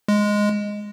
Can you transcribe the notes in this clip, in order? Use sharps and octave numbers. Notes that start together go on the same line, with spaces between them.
G#3